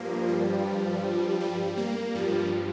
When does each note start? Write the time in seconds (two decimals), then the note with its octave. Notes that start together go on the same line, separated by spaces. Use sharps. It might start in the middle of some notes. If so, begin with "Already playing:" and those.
Already playing: G2 F3 A#3
0.28 G3
1.40 G3
1.77 A#3
2.15 G2 F3 G3